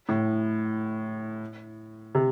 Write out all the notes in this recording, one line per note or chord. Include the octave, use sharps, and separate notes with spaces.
A2
C3